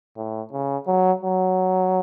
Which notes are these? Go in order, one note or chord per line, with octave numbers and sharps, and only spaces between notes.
A2
C#3
F#3
F#3